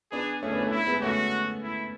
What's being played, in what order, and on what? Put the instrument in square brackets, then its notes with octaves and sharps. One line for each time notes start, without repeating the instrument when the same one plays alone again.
[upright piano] B3 D4 [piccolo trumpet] G#4
[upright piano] A3 C#4 [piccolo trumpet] G#4
[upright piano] B3 D4
A3 C#4
[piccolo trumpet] E4
[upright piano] G#3 B3
[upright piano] A3 C#4 [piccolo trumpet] F#4
[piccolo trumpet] E4